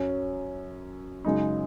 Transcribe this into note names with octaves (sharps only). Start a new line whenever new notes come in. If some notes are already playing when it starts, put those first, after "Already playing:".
Already playing: F#2 F#3 C#4
F#2 C#3 G#3 D#4